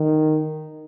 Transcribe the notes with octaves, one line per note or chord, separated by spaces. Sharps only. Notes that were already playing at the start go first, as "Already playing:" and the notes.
Already playing: D#3